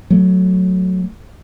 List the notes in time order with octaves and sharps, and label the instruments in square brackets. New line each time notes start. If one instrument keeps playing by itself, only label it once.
[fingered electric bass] F#3 A3